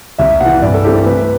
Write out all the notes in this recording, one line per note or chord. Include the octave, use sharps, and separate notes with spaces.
C2 E5
C3 E3 F#5
G2 D5
A4
E3 A3 C4 G4
A4
C3 B4